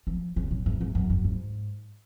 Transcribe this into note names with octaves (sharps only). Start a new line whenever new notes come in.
F3
C#3
A2
G#2
G#2
F#2
F#2
G#2